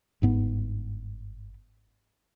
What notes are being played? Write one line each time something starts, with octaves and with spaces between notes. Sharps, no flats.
G1 G#2 B3